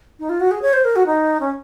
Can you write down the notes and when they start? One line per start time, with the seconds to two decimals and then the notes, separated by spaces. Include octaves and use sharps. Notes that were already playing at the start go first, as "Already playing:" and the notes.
0.19 D#4
0.29 F4
0.40 F#4
0.51 G#4
0.62 C#5
0.73 C5
0.85 A#4
0.96 F#4
1.06 D#4
1.40 C#4